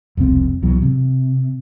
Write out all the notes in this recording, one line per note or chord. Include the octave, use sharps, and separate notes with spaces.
E1 C2 F2 C4
C2 B2 E3 F#3
C3